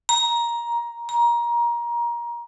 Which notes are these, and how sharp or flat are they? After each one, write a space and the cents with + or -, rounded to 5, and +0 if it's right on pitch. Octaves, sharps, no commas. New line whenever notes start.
A#5 +15
A#5 +25